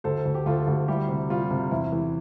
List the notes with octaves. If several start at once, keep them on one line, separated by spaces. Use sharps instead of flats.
D2 A4 C5
D2
G4
D2 F4 A4
D2
G3 E4 G4
C3
G3 F4
C3
E2 E4
E3